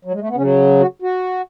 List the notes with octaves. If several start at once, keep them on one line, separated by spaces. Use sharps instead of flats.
F#3
G#3
A3
B3
C#3 F#3 C#4
F#4
F#4